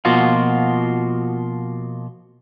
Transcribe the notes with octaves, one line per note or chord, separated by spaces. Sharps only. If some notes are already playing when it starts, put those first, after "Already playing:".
B2 F3 A#3 F4 F#4